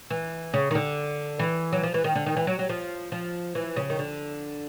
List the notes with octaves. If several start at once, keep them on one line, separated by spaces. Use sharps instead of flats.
E3
C#3
D#3
D3
E3
F#3
F3
E3
D#3
D3
D#3
E3
F#3
F#3
F3
F3
E3
C#3
D#3
D3